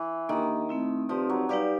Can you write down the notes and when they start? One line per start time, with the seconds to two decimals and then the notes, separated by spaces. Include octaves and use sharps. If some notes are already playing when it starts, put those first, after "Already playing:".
Already playing: E3
0.29 D#3 A#3 D4 G4 A#4
0.69 A3 C4 E4
1.09 F3 C4 D#4 G4 B4 D5
1.29 F#3
1.49 G3 D#4 G4 B4 D5 F5